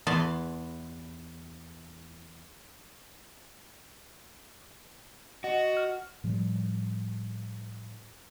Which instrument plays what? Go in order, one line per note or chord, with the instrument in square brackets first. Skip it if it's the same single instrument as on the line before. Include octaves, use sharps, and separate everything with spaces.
[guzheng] E2 B3 B4 A5 C6
[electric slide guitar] F#4 [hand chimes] D#5
[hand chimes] F6
[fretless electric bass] A2 F3 G3